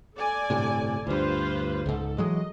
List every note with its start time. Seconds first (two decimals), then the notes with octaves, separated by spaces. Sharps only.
0.15 A4 D5 G#5
0.50 G1 A2 C3
1.07 D2 G2 F4 B4 C5
1.86 C#2 G#2 A4
2.18 E3 F#3 G#3 D#5